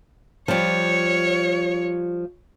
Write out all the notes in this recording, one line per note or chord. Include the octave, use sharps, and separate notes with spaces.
F3 G3 C#5